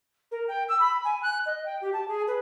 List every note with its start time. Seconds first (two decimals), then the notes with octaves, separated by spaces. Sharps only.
0.31 A#4
0.48 G5
0.69 E6
0.80 B5
1.04 G#5
1.23 F#6
1.46 D#5
1.66 G5
1.81 G4
1.93 A5
2.08 G#4
2.27 B4